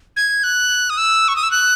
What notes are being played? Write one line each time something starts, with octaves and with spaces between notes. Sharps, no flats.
G#6
F#6
D#6
E6
C#6
D#6
E6
F#6